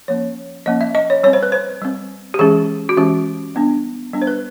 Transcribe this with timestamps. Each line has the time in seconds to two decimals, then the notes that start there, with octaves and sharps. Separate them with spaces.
0.08 F3 A#3 C#4 C#5
0.66 F3 A#3 C#4 D#5
0.81 E5
0.95 D#5
1.10 C#5
1.23 G3 C4 C#5
1.33 C5
1.43 B4
1.52 C5
1.82 G3 C4
2.34 G4
2.39 E3 G#3 C#4 G#4
2.89 F#4
2.97 E3 G#3 C#4 G4
3.55 G3 B3 D4
4.13 G3 B3 D4
4.22 C5
4.27 B4